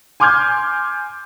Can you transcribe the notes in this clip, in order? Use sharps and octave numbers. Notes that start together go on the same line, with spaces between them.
G#5 C6 D6 F6 G6 G#6